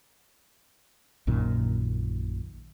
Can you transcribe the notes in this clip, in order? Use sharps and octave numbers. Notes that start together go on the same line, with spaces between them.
A#1 F#2 A#2 D#3